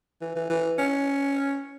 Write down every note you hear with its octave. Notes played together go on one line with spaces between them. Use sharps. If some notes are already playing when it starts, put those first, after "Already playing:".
E3
E3
E3
C#4